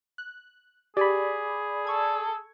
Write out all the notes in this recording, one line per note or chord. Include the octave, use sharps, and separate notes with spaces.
F#6
G4 G#4 D5 G#5 B5
A4 C#6 G#6